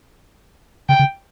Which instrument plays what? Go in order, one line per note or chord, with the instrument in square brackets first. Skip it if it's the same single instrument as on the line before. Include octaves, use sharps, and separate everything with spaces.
[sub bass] C#3 [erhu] G5
[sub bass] C#3